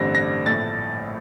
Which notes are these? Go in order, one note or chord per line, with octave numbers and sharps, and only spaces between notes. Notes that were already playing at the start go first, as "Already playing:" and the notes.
Already playing: A1 G2 D3 G3 C4 A#6
A#6
A#1 A2 A3 A6